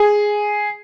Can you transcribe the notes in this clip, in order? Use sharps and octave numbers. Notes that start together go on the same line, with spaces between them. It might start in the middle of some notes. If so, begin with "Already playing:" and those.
Already playing: G#4